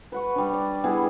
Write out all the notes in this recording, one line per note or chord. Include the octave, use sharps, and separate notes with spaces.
B4 F#5 C#6
G3 D4
D5
G3 B3 E4 G#4